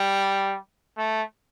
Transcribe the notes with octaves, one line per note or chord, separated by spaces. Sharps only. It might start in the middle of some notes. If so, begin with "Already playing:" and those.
Already playing: G3
A3